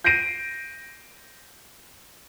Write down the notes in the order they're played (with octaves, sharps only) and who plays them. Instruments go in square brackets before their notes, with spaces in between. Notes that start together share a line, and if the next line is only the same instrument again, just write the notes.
[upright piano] G6 A#6 C7 D7 D#7